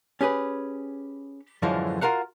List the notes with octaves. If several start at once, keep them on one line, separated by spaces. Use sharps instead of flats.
C#4 G4 G#4 B4
F#2 A2 D3 E3 F3 G#3
F4 F#4 A#4 F5 F#5